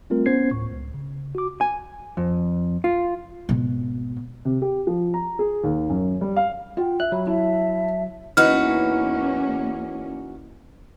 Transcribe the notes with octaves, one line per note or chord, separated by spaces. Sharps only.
G3 A3 C4 F4 A#4
B3 C#4 C5 G#6 C7
D2 A2 C#6
C#2
C#3
F#4 D6
G#5
F2
F4
G#1 B2
C3
G4
F3
A#5
G#4
D#2
F#2
G3
F5
F4 F#5 G5
E5 F#6
F#3 B5
E4 E5 A5
E2 E3 A#3 C#4 D#4 F#4 B4 F6